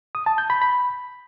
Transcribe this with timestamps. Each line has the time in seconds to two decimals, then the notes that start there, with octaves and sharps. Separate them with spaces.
0.15 D#6
0.26 A5
0.38 G6
0.50 B5
0.62 B5